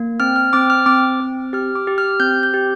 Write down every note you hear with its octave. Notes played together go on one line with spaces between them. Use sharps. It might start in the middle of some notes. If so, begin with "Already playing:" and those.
Already playing: A#3
C4 F6
F6
C4 D6
F6
C4 D6
C4
G4 F6
D6
G4
F6
C4 G6
G6
G4